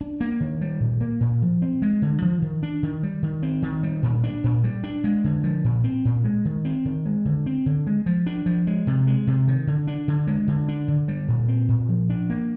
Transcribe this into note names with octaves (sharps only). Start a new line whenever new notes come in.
D4
A#3
D#3
G3
A#2
A#3
A#2
F3
C4
G#3
D3
F3
D#3
D4
D#3
G3
D#3
C4
D#3
G3
A#2
D4
A#2
G3
D4
G#3
D3
F3
A#2
C4
A#2
G#3
D#3
C4
D#3
G#3
D3
C4
D3
G#3
F3
D4
F3
G#3
C3
G#3
C3
D#3
D3
D4
D3
G#3
D3
D4
D3
G3
A#2
C4
A#2
F3
D4
A#3